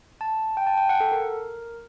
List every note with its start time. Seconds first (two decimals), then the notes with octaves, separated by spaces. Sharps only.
0.21 A5
0.57 G5
0.67 A5
0.77 G5
0.89 F#5
1.00 A4
1.12 A#4